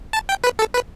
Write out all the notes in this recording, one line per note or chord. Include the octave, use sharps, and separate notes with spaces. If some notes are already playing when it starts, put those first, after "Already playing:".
A5
G5
B4
A4
B4